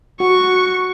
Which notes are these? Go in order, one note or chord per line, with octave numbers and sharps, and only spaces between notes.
F#4 C#6